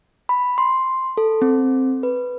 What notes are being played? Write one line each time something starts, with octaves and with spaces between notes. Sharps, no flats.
B5
C6
A4
C4
B4